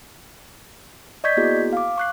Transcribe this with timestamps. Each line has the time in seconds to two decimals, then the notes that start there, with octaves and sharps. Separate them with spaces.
1.24 D5 D#5 C#6 G6 G#6 B6
1.37 A#3 B3 E4 F#4 G#4
1.73 F5 D6
1.98 C#6 F#6 C7